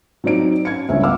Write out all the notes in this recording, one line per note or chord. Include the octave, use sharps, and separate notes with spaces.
F#3 C4 D#4 D5 D7
C#4 G#6 C#7
G1 C#2 C#4 E5
F5 F#5 D6 E6 F6